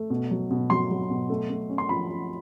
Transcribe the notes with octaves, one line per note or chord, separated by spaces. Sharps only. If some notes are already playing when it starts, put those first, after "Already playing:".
Already playing: A3
B2
F#3
B2
F#3 C6
F#3
B2
A3
A3
C#4
C6
F3 B5
F3